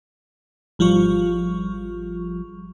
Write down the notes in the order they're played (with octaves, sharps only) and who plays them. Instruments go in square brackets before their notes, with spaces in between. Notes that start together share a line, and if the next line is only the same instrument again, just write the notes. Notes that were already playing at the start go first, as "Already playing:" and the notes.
[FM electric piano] G#1 F3 G3 F4 C#6